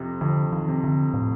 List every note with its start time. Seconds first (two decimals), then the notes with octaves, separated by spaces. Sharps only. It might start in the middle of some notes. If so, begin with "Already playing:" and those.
Already playing: F2 C3
0.21 F2 D3
0.53 D#3
0.68 C3
0.84 D3
1.14 A2